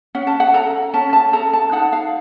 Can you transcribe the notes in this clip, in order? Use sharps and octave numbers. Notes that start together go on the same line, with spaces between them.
C#4 F#5
A5
F#5
A4 A#5
C#4 A5
A5
A4 A#5
A5
D#4 F#5
F5